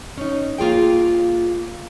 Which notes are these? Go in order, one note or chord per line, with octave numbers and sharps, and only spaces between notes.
C#4 D#4
A#3 F4 G#4 G5